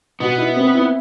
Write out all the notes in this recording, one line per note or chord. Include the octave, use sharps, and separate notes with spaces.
B2 B3
E4
C4
E4